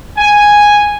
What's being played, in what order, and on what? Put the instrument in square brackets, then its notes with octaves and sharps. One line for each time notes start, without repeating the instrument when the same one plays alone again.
[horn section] G#5